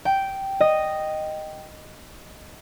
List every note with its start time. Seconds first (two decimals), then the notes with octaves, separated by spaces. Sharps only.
0.05 G5
0.60 D#5